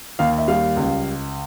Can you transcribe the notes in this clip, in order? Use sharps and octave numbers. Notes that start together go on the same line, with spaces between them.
D#2 F5
E5
G3 F5
C#2